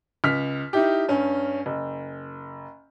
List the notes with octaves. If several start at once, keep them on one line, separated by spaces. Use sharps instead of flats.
C#2 F6 B6
D#4 E4 G4
G2 C#4
F#1